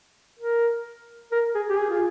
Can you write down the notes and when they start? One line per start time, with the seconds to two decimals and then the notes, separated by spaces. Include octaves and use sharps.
0.39 A#4
1.32 A#4
1.55 G#4
1.70 G4
1.78 G#4
1.90 F4